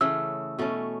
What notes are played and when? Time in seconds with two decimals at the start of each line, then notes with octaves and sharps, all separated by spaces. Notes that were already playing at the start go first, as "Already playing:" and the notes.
0.01 C#3 E3 A3 E6
0.59 B2 A3 C#4